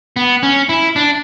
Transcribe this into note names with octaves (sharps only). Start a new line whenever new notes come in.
B3
C#4
E4
D4